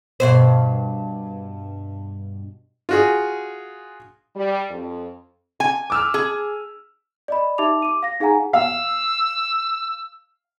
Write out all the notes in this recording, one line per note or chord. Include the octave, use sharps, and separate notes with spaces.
G2 B2 C5
F4 F#4 G#4
G3
F2
G#5
D6 E6 F6
G#4
D5 D#5 B5
D#4 G4 E5 A5 D6 F7
D6 D#7
F5 A#6
D#4 G#4 F5 F#5 G#5 A#5
F5 E6